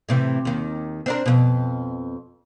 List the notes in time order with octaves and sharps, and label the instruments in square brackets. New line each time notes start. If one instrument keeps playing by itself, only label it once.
[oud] A2 C3 E3
D#2 D#3
C4 D4 A#4
F2 B2